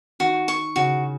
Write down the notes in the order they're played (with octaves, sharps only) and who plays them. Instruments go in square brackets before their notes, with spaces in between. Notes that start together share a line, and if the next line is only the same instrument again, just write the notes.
[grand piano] D#3 [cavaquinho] F#4
[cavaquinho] C#6
[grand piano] C#3 [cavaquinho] F#4